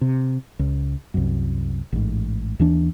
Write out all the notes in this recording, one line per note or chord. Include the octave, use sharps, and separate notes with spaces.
C3
C#2
C2 F#2
A1 G#2
D#2 E3 D4